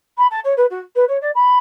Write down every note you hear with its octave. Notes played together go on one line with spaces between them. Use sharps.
B5
A5
C#5
B4
F#4
B4
C#5
D5
B5